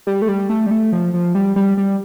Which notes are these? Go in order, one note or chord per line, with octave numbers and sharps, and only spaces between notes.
G3
A3
G3
A3
G3
A3
F3
F3
G3
G3
G3